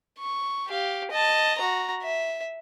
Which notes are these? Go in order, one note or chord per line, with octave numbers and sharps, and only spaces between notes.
C#6
G4 F5
D#5 A5
F#4 A#5
E5